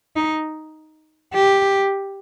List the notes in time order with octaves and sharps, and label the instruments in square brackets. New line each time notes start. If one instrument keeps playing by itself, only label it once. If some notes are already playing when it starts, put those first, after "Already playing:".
[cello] D#4
G4